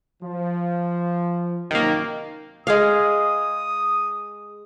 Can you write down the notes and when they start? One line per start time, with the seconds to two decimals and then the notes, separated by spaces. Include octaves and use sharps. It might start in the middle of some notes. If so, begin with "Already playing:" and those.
0.22 F3
1.71 F#2 C3 D#3 A#3 D#4
2.67 G#3 G#4 F5 D#6